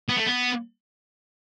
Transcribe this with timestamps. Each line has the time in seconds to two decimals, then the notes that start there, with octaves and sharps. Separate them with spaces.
0.09 B3
0.17 A3
0.26 B3